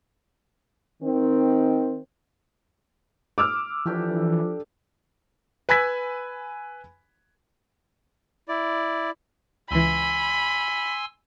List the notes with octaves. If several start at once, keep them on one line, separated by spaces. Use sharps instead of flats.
D#3 C4
D6 E6 F6
E3 F3 D4 G4 A4
B4 G#5 B5 E6 G#6 B6
E4 D5
C#2 E3 G#5 B5 C6 E6